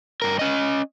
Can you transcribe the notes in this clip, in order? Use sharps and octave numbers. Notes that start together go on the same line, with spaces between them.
G2 A#4
C#4 D#5